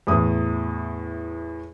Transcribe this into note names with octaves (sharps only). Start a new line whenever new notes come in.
E2 A2 D#6